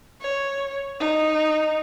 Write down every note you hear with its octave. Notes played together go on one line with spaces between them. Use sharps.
C#5
D#4